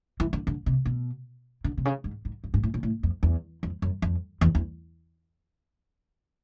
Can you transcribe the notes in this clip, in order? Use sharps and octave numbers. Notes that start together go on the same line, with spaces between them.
E3
D3
D3
C3
B2
D3
C3
C#3
G#2
G#2
G2
G#2
A2
A#2
A2
F2
E2
F2
F#2
F2
E2
E2